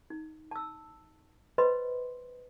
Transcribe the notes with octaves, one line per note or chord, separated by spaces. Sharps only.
D#4
A5 E6
B4 C5 D#5 B5 C6